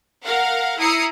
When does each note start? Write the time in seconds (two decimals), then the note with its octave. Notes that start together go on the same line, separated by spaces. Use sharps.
0.23 A#4 F5 F#5
0.78 E4 A#5 D#6 C7 C#7